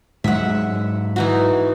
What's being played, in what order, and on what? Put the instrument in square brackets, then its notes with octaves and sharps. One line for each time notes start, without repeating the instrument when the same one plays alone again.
[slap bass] G#2 F#3 [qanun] E5 F#5
[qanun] E3 D#4 F#4